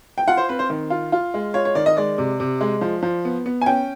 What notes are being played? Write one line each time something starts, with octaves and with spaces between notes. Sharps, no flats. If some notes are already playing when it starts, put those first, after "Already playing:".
G5
F4 F#5
C5
C4 B4
C5
D#3
F4
F4
G#3
F4 C#5
C#5
D#3 D5
D#5
G#3 D5
C3
C3
G#3
F3
F3
B3
B3
G#5
C#4 G5